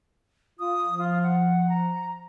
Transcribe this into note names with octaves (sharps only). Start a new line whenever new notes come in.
F4 D#6
F3
F4
F#5
A#5